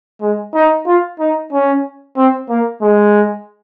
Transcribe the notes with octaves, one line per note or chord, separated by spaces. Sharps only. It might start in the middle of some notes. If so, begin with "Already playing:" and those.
G#3
D#4
F4
D#4
C#4
C4
A#3
G#3